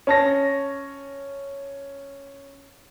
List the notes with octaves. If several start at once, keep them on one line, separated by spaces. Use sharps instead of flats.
C#4 A5 A#6